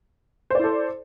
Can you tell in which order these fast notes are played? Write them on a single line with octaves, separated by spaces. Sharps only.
C5 D5 E4 A4